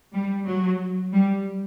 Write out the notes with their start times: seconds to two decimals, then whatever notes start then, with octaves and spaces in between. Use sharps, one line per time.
0.14 G3
0.47 F#3
1.13 G3